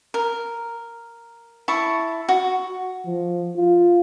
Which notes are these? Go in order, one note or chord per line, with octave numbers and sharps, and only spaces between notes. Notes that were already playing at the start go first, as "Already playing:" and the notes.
A#4
E4 A5 C#6
F#4
F3
F4